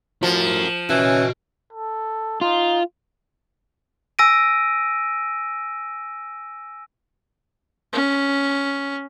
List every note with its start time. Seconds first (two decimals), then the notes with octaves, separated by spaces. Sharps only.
0.23 A2 F3 F#4 A#4
0.90 E3 C#4 F#4 D#5
1.73 A4
2.41 D#4 F4
4.19 G#5 E6 A#6 D7 D#7
7.93 C#4